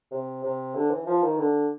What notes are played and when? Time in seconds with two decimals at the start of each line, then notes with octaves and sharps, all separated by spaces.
0.11 C3
0.43 C3
0.75 D3
0.90 E3
1.06 F3
1.22 D#3
1.38 D3